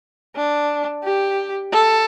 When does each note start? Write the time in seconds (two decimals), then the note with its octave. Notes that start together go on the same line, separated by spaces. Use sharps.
0.36 D4
1.04 G4
1.72 A4